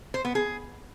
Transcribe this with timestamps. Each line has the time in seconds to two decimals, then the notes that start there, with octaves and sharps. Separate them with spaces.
0.14 C5
0.25 B3
0.35 G#4